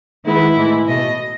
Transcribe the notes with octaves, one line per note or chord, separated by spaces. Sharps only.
D#3 G#3 B3 E4
A2 E3 G#3
B2 A3 D#5